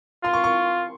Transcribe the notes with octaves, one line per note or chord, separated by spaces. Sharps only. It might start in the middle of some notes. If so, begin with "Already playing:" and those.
F4 C6
C#6
C#6